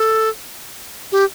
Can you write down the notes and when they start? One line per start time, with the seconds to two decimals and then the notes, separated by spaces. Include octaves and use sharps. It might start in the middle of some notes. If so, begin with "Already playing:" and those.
Already playing: A4
1.12 G4